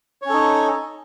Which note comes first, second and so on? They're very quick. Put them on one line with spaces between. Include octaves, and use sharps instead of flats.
C#5 C#4 A4 D#4